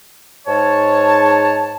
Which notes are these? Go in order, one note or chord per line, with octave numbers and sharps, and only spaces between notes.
G#2 C#5 A5